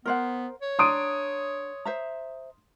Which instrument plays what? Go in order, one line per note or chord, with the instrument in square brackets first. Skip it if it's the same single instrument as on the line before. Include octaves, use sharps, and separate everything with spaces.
[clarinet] B3 [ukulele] A#4 C5 F#5
[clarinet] C#5
[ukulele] D4 A#5 [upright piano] C6 D#6 D7
[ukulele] C5 E5 A#5